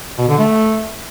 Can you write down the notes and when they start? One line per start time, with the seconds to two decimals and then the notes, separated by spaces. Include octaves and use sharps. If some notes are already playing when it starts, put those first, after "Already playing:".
0.18 B2
0.28 D3
0.38 A3